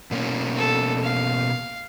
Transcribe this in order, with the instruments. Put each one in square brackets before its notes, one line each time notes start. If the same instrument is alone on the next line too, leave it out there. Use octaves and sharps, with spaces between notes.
[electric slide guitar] B2 A#3 C#4
[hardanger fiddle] A4
F5